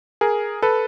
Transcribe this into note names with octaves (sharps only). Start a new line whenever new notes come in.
G#4 A#4
A4 B4